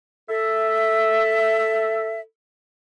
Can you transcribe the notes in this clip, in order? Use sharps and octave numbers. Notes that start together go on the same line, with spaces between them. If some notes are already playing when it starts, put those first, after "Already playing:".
A4 E5